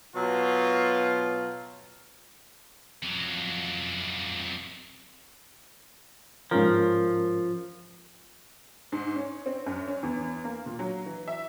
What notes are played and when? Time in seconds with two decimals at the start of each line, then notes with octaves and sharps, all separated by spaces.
0.16 B2 F#3 F4
3.03 F2 F#3
6.51 G#2 F3 C#4 A#4
8.92 G#2
9.16 C#4
9.46 C4
9.66 F#2
9.88 C#4
10.03 E2
10.44 A#3
10.66 A#2
10.79 F#3
11.06 E3
11.28 E5